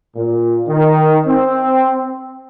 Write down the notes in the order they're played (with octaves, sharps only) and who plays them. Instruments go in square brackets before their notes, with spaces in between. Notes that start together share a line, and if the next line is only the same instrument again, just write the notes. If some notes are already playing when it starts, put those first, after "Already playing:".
[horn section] A#2
D#3
C4